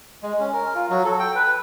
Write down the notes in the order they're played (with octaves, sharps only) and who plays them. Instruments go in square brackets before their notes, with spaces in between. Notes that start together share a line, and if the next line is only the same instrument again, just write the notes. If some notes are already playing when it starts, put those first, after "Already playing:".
[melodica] G#3
C#4
A#4
F4
F#3
A4
G5
B4